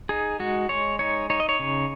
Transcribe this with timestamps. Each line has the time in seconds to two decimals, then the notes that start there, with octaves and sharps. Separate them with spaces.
0.09 D#4 G#4
0.40 G#3 F#4
0.69 G#3 C#5
0.99 D#4 C#5
1.30 D#4 C#5
1.40 D#5
1.49 C#5
1.60 C#3